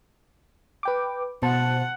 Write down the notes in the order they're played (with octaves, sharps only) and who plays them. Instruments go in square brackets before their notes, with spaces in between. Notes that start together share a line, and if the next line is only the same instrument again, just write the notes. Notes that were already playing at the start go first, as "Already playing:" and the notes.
[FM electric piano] B4 G5 D6
[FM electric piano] B2 C5 A5 [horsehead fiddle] F#5